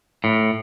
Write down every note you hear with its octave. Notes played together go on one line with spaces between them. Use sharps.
A2